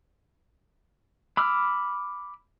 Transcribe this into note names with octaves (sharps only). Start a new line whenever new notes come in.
B5 D6 E6 F6